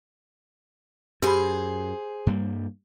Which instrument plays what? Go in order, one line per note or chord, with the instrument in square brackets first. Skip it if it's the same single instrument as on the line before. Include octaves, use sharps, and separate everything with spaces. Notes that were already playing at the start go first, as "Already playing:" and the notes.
[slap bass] F#2 [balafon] G4 B5 [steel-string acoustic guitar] G#4 C5
[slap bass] G2 G3 A#3